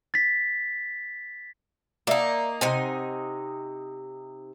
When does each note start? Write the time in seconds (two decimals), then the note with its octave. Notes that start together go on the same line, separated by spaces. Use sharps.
0.14 A6 B6
2.07 A#3 D#4 D5 E5
2.61 C3 D#4 C5 F#5 G#5